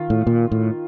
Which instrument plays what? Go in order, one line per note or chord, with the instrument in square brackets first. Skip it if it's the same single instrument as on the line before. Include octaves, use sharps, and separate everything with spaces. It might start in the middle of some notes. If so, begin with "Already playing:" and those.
Already playing: [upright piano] D#3 F4
[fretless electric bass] A2
A#2
A2